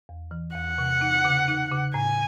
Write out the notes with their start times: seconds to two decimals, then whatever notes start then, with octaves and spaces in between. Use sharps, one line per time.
0.09 E2
0.31 E3
0.55 E2 F#5
0.78 C3
1.01 D#4
1.25 C#3
1.48 D#4
1.71 C#3
1.94 A2 G#5